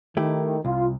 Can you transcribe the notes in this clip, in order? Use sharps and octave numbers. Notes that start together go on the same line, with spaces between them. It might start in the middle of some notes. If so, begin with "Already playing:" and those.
D#3 A3 E4 G4
C2 F4